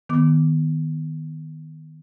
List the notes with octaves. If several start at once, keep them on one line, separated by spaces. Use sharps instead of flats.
D#3 B3 D6